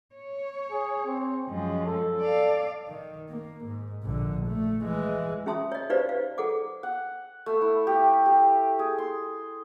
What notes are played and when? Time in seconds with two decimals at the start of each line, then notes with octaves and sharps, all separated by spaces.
0.15 C#5
0.71 G#4
1.06 C4
1.48 F#2 F3 G#3
1.86 A4
2.21 D5 F5
2.90 D#3
3.29 A#3
3.65 G#2
4.03 A#1 D3
4.47 A3
4.84 E3 G#3
5.46 C#4 G#4 E5 A5 C6 D#6
5.72 C#5 D#5
5.90 D#4 G4 B4 C5 D5 F5
6.09 F5
6.38 G#4 A4 F#5 D6
6.83 F#5
7.46 A3
7.61 E4
7.87 G4
8.26 G4
8.79 G#4
8.98 C6